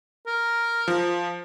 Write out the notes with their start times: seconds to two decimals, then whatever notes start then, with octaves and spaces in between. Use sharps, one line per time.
0.27 A#4
0.88 F3